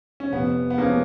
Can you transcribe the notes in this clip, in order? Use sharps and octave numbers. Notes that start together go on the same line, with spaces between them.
C#4
F1 B3
B3
F2 F3 G#3 A#3 C#4